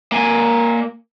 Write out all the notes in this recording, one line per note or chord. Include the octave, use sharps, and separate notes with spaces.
A#3 G#5